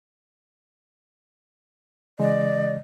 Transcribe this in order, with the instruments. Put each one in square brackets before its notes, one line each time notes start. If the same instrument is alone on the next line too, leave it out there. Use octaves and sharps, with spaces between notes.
[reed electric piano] C#3 E3 G#3 [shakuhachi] D5 [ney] D#5